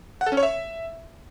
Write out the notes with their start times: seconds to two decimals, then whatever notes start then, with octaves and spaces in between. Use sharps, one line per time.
0.21 F#5
0.26 A4
0.32 C#4
0.37 C#5
0.43 E5